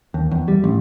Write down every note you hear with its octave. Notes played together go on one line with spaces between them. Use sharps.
D#2
E2
G3
A1